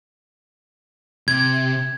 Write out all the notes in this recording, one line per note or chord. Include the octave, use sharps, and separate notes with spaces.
C3 G#6